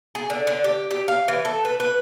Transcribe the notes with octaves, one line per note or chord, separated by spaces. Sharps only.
G#4
D3
D3
G4
G4
F5
E3
A4
B4
B4